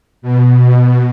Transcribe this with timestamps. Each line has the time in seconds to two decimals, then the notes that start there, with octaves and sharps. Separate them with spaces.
0.22 B2